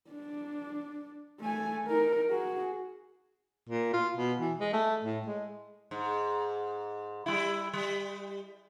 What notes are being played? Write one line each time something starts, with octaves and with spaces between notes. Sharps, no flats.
D4
A3 G#5
D#4 A#4
F#4 G#4
A#2
F4
B2
E3
G#3
A3
A2
G#3
G#2
G3 E4
G3